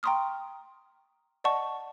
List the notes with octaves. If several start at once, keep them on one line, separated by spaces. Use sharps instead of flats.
G5 A#5 C6 C#6 D#6 F6
D5 D#5 F#5 A5 C#6